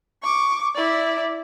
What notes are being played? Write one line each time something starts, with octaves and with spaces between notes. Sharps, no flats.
C#6 D6
E4 D5